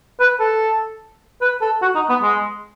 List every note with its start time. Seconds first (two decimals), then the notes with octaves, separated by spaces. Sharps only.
0.20 B4
0.40 A4
1.42 B4
1.62 A4
1.82 F#4
1.95 D#4
2.09 B3
2.23 G#3